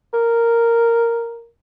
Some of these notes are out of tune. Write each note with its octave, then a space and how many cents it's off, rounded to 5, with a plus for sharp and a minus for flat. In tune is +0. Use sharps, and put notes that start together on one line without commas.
A#4 -5